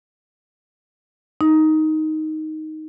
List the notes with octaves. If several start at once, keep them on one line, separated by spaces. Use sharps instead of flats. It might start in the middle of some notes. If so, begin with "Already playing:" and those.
D#4